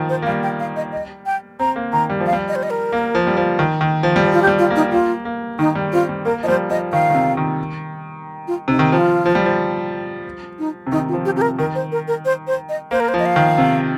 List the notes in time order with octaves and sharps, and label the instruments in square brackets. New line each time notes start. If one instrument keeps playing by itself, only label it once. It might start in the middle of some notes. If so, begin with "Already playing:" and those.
Already playing: [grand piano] D#3 F3
[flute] C5
[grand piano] A#3
[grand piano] G3 [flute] F5
[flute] G5
F5
D#5
D#5
G5
[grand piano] C4 [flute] A#5
[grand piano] A#3
[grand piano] D#3 [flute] A#5
[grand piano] G3
F3
[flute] F5
[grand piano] G3
[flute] D#5
C5
D#5
A#4
[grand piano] A#3
F3
G3
F3
D#3
D#3
F3
G3
F3
[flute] F4
G4
[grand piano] G3
[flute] F4
[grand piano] A#3
[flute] D#4
[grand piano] A#3 [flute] F4
[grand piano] A#3
[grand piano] D#3 [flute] D#4
[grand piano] G3
[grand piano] C4 [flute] F4
[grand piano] G3
[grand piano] A#3 [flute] A#4
[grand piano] F3 [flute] D#5
[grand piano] G3 [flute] C5
[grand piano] F3 [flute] D#5
[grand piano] D#3 [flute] F5
[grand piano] D#3
C3
D#3
[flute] F4
[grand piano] C3 [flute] D#4
[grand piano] D#3
[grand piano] F3 [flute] F4
[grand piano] F3
G3
F3
[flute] D#4
[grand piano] C3
[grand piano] D#3 [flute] D#4
[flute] F4
[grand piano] F3
[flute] G4
[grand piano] C3 [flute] G4
[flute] A#4
[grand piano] D#3 [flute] A#4
[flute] C5
A#4
A#4
C5
C5
D#5
[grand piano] A#3 [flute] C5
[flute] A#4
C5
[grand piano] F3
[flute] D#5
F5
[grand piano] D#3
C3